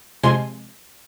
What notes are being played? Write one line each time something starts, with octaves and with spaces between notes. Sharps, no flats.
C3 F3 G#3 G#5 C6